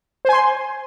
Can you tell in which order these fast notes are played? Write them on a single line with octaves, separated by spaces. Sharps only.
C5 G#5 C6